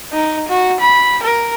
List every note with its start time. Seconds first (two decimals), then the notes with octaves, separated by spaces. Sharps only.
0.12 D#4
0.48 F#4
0.80 B5
1.23 A#4